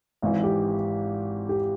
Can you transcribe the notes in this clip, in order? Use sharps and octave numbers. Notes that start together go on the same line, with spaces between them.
G#1 G#2 E3
G4
G4